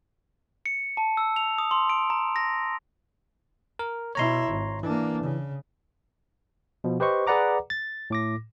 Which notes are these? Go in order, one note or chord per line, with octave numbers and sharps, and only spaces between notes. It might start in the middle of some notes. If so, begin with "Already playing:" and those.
C#7
A5
E6
F7
D#6
C6
D7
A#5
A#6
A#4
B2 E4 C#5 A#5 C6
G#1
E3 A#3 D4
C#3
B2 F3
G4 B4 C5 D#5 C#6
G#4 B4 D5 F#5 A#5 D6
A6
A2 D6 A#6